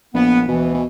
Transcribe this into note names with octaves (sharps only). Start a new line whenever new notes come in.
A#1 B3
D2 B2 E3
B2